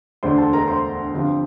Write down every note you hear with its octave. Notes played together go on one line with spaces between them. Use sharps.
E1 D2 D3 A3 D4 C5 C6
A4 A5
A#4 A#5
C5 C6
G1 G2 F3 C4